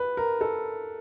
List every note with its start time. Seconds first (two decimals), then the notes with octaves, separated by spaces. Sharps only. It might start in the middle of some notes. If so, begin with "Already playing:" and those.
Already playing: B4
0.17 A#4
0.41 A4